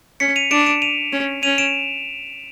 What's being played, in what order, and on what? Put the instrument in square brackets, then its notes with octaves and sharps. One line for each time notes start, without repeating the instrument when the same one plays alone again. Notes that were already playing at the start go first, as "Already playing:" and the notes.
[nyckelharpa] C#4 [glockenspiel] B6 C#7
[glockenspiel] D#7 F7
[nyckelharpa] D4 [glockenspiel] D7 E7
[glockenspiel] D7 E7
D#7 F7
[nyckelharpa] C#4
[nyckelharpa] C#4 [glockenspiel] D#7 F7
[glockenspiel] D7 E7